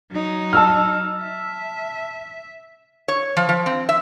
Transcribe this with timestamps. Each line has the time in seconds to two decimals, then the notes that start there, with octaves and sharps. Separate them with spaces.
0.11 F#3 D#4
0.53 A5 E6 F6
1.22 E5
3.08 C#5
3.37 F3
3.49 F3
3.66 C4
3.89 E5